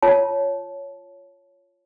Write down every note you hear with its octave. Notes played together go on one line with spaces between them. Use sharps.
F4 C#5 A5